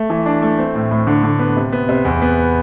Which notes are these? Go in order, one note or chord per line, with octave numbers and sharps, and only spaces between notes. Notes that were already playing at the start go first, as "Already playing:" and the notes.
Already playing: A3
E3
D4
A3
C4
A2
A2
D3
D3
B3
C3
B3
C3
E2
B3